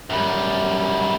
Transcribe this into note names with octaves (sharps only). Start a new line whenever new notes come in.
F#2 G3